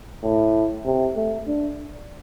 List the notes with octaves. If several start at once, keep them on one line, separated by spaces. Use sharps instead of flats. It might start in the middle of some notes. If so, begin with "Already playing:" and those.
A2
C3
A3
D4